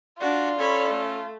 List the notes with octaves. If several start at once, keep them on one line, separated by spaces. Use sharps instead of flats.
D4 F4 F#4 D5
C#4 A4 C#5 B5
A3